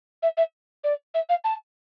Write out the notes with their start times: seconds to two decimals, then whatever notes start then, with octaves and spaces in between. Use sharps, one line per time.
0.23 E5
0.37 E5
0.84 D5
1.14 E5
1.29 F5
1.44 A5